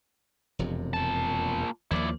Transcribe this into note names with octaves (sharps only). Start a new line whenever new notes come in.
E1 F2 C3
A#2 A5
D#2 F3 A#3 E4 D5